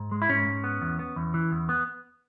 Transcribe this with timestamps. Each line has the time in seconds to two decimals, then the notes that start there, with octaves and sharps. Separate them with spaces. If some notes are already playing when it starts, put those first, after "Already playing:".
Already playing: G#2
0.12 G#3
0.22 E4
0.29 G#2 C#4
0.46 G#2
0.64 B3
0.82 E2
0.99 B3
1.16 E2
1.34 E3
1.52 E2
1.69 B3